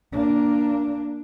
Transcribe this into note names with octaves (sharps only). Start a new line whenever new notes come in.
A#3 D4